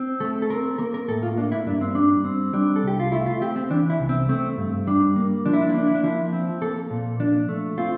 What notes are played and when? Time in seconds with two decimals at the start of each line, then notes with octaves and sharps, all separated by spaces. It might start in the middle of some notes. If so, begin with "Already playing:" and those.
Already playing: C4
0.20 A3 A4
0.42 A4
0.50 C4 A#4
0.78 A#3 A#4
0.94 A#4
1.08 A2 A4
1.23 F4
1.37 A#3 D4
1.52 E4
1.66 G2 D4
1.81 C4
1.95 G3 D4
2.25 C4
2.53 G3 D4
2.76 A4
2.83 C2 G4
2.99 F4
3.12 A3 E4
3.26 F4
3.41 C4 G4
3.56 C4
3.70 E3 D4
3.90 E4
4.00 C2
4.09 C4
4.29 A3 C4
4.58 G2
4.87 G3 D4
5.16 A#3
5.46 F3 D4
5.53 E4
5.62 D4
5.69 E4
5.74 A#3 D4
5.86 E4
5.95 D4
6.03 F3 E4
6.33 C4
6.62 A#3 A4
6.91 A#2
7.20 F3 D4
7.49 A3
7.78 C4 F4